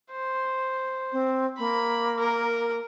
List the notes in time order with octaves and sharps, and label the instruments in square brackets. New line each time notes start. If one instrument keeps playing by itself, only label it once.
[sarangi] C5
[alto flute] C4
[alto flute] A#3 [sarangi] B5
[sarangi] A#4